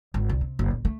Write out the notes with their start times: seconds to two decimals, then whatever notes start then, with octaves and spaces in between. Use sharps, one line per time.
0.14 G#1
0.29 C2
0.41 C3
0.59 F#1
0.71 A#2
0.85 A3